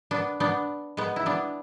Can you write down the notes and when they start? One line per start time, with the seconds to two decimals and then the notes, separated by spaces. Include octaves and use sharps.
0.11 B3 D4
0.40 B3 D4
0.97 G#3 B3
1.16 E4
1.26 B3 D4